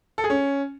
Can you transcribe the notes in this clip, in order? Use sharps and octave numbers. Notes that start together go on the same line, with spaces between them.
A4
G#4
C#4